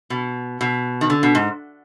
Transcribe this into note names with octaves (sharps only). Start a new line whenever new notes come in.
B2
B2
D#3
D3
B2
G#2